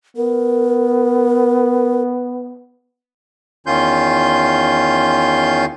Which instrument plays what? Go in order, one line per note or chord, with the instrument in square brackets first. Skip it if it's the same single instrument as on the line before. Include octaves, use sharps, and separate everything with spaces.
[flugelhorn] B3 [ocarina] A#4
[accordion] E2 D#3 C#4 F4 C6 G6